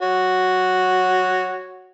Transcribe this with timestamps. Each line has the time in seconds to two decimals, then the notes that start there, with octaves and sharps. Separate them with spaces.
0.02 F#4 C#5